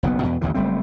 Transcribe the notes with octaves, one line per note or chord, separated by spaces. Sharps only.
F#1 B1 C3 B3
E2 B2
A1 D#2 D3 E3
F#1 G3 A3 C4